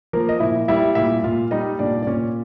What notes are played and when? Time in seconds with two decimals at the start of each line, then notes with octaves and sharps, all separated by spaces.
0.13 F3 A#3 A#4
0.29 D#5
0.40 A#2 E4 E5
0.68 G3 E4 E5
0.95 A#2 E4 E5
1.23 A#2 F4 F5
1.51 G3 D#4 D#5
1.79 A#2 D4 D5
2.02 D5
2.07 A#2 C#4 C#5